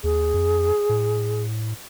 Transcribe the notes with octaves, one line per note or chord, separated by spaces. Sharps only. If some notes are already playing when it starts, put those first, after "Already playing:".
D#2 G#4
F2
A2